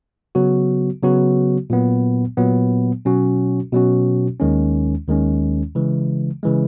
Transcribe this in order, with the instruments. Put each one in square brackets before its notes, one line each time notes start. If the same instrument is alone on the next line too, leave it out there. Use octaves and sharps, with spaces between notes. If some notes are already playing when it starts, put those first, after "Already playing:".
[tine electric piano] C#3 F#3 B3 F#4
C#3 F#3 B3 F#4
A#2 F#3 B3
A#2 F#3 B3
B2 F#3 C#4 F#4
B2 F#3 C#4 F#4
D#2 D#3 G#3 C#4
D#2 D#3 G#3 C#4
C#3 E3 G#3
C#3 E3 G#3